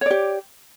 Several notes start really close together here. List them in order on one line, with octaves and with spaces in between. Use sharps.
C#5 D5 G4